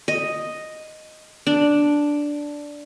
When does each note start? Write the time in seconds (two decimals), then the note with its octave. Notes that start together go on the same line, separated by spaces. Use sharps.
0.08 D#5
1.47 D4